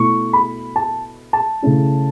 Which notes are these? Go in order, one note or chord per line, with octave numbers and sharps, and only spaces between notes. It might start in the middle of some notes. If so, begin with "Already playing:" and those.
Already playing: B2 A3 E4 C#6
B5
A5
A5
C#3 A3 C#4 E4